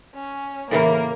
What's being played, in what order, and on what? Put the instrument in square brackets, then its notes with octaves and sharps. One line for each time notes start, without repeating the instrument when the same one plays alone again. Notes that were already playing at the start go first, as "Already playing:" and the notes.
[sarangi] C#4
[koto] A2 C#3 E3 [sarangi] A#3 [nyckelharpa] A#4